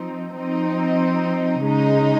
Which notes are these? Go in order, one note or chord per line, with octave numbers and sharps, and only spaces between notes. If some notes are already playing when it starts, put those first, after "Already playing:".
Already playing: F3 C4 D#4
F3 C4 D#4
C#3 G#3 D#4